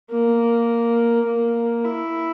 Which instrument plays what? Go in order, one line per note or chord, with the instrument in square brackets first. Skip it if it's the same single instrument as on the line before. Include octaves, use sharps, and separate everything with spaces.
[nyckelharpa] A#3
A#3
E4